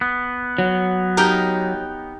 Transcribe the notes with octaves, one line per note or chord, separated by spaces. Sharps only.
B3
F#3
D#4 G4 A#4